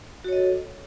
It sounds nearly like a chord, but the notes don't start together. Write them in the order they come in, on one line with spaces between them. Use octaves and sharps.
F#4 C#5 D#5 A4